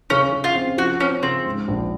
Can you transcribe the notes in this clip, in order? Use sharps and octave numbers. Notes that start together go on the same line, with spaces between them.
C#3 C#4
C#3
F4
C4
F3 F#4
C4 C#4
C#3 C4
G#2
A#1